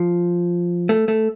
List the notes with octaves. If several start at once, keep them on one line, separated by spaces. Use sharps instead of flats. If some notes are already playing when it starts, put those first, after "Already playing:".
Already playing: F3
A3
A3